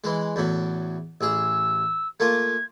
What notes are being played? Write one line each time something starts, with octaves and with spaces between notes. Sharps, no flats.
E3 G#3
E2 A2 F#3
A1 G#4 E6
A3 A#3 F4 G#6